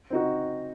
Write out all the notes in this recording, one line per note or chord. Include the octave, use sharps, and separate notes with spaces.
C4 D#4 F#4